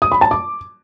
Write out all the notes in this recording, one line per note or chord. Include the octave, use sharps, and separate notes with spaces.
D#6
B5
A5
D6